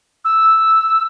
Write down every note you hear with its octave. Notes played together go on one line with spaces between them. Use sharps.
E6